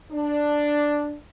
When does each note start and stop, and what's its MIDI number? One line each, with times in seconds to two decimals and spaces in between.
0.12 1.16 62